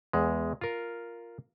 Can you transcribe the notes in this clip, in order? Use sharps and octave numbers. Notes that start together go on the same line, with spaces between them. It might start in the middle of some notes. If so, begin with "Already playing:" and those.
E2 G#3
F4 A#4